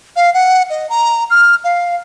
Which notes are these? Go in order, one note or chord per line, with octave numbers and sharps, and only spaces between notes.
F5
F#5
D#5
A#5
F6
F5